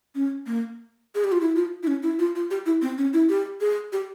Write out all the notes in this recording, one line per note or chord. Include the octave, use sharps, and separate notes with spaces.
C#4
A#3
G#4
G4
F4
E4
F4
E4
C#4
E4
F4
F4
G4
E4
C4
C#4
E4
G4
G#4
G4